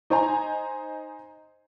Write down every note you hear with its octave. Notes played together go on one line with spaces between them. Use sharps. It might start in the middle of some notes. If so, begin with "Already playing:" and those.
D#4 C5 G#5 A#5